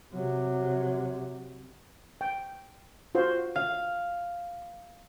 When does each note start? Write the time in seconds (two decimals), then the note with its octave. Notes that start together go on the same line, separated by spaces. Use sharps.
0.13 C3 F#3
2.21 G5
3.15 F4 F#4 C5
3.56 F5